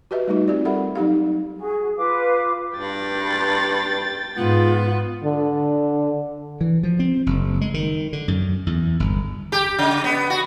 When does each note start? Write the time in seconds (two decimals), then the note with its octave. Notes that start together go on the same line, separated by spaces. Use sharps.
0.11 F#4 G4 B4 D#5 E5
0.28 G3 A3 D#4 F4 F#4
0.48 C4 G4 D5
0.65 G3 A4 A#4 E5 F#5 B5
0.95 F#3 D#4 G4 F5
1.57 F#4 G#4
1.97 F4 B4 F5 D6
2.77 G2 G5 A6
4.37 G#2 B3 F4
5.24 D3
6.61 E3
6.83 F3
6.99 C4
7.26 F#1
7.61 G#3
7.74 D#3
8.13 D3
8.28 F#2
8.67 E2
9.00 G1
9.52 G4
9.79 C#3
10.04 B3
10.30 F#4